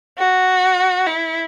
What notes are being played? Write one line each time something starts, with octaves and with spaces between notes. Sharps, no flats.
F#4
E4